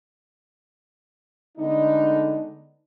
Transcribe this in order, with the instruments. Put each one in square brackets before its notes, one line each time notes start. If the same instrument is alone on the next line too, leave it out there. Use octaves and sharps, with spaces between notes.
[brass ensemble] D3 G#3 A3 B3 D4 D#4